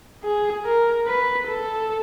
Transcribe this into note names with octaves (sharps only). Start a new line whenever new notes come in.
G#4
A#4
B4
A4